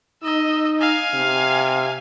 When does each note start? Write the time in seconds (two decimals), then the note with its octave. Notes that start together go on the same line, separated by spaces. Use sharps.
0.23 D#4 D#5 E6
0.80 F5 G#5
1.14 C3